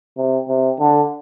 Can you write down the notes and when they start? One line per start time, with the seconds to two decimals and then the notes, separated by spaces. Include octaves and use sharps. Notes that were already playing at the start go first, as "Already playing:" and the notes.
0.17 C3
0.49 C3
0.80 D3